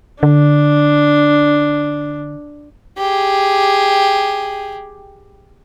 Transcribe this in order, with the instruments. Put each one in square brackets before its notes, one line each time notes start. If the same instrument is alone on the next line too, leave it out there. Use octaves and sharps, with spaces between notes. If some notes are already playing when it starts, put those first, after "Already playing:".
[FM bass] D3 [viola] D4
[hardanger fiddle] G4 G#4